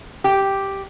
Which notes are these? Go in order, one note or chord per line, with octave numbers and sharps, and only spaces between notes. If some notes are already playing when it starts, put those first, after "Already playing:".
G4